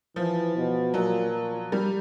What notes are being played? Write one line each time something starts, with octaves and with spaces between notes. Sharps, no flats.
E3 F3
B2
A#2 F#3
G3